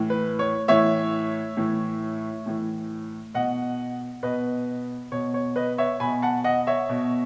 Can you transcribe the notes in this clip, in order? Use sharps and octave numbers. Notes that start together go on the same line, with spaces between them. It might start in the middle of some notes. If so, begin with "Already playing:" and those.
Already playing: A2 E3
B4
C#5
A2 E3 C#5 E5
A2 E3
A2 E3
B2 D#5 F#5
B2 B4 D#5
B2 C#5
C#5
B4 D#5
C#5 E5
B2 G#5 B5
F#5 A5
D#5 F#5
C#5 E5
B2